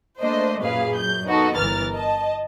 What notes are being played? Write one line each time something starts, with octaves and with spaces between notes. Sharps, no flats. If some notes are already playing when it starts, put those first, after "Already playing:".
A3 A#3 D4 C5 D#5
F#2 A#2 G#4 B4 F5
F#2 G6
B3 D#4 F#4 A4
G1 E3 A#4 F6 A6
D#5 A5